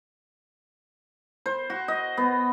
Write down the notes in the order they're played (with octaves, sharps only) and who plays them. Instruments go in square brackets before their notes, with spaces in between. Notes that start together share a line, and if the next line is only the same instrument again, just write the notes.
[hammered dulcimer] C5
F#4
D#5
B3